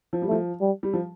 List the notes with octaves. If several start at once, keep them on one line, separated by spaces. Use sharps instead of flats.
F3
G3
F3 A3
G3
G3
F3